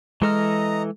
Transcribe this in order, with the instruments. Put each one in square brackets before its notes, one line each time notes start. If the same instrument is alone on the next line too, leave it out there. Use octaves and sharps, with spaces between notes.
[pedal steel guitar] E3 A4 F6 [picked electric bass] G#3 [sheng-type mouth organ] D#5 A#5